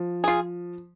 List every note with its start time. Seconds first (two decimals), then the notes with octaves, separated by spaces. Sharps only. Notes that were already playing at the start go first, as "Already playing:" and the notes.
Already playing: F3
0.24 F4 G#4